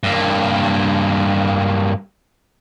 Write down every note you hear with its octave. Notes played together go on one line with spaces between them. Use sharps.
G2 A#3